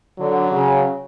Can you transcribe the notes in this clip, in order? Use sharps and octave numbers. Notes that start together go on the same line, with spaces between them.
D3 F#3
C#3